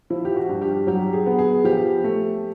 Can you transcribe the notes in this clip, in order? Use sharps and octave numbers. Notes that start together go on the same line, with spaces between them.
F3 E4
G4
F#4
G2
G4
F#3 G4
G#4
B3
G#4
F3 G4
A3